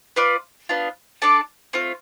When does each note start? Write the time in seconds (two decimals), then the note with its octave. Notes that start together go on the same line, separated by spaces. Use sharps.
0.16 F4 B4 D5
0.69 B3 D4 F4
1.22 D4 A4 D5 A5
1.73 A3 C4 F4